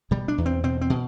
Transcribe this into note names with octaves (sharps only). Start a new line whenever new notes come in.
B2 G3
D4
E2
C4
B2 C4
C4
B2